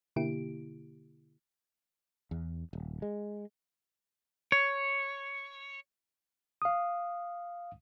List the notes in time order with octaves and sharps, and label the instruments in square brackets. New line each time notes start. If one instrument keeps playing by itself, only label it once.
[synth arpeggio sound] B2 D3 A#3 E4 G4 D7
[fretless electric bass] E2
D#1
G#3
[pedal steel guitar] C#5
[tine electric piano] F5 D#6